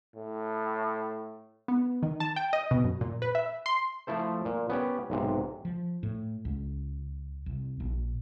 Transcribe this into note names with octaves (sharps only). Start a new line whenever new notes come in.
A2
B3
D#3
A5
G5
D#5
B2
F#2
A#2
B4
E5
C6
F3 A3 E4 A4 C5
A#2
B3 C#4 G4
B1 G#2 C3
F3
A2
C#2
C2
A#1